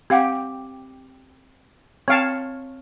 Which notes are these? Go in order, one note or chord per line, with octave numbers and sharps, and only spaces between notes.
C4 G4 F5 F#5
C4 C#5 F5 G5 A5